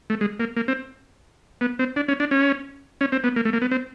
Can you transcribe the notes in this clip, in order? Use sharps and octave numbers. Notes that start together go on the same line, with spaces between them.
A3
G#3
A#3
A#3
C4
B3
C4
D4
C#4
D4
C#4
C#4
C4
B3
A#3
A3
A#3
B3
C4